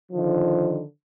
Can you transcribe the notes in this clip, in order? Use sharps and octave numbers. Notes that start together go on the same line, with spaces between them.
D3 D#3 F3